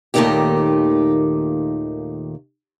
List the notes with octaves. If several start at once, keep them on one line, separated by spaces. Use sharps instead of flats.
D#2 A#2 D#3 A3 D#4 G4